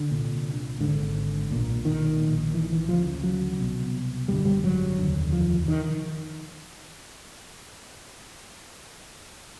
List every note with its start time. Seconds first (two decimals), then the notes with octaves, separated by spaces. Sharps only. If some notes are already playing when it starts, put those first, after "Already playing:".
Already playing: D3
0.10 C2 A#2
0.80 G#1 G#2 D3
1.50 B1 A#2
1.85 D#3
2.20 A#1 A#2
2.54 E3
2.72 E3
2.89 D2 C#3 F3
3.23 F#3
3.59 C2 B2
4.28 G#1 F#2 D3 G3
4.45 G3
4.64 F#3
4.98 F1 D#2 D3
5.32 F3
5.68 D#3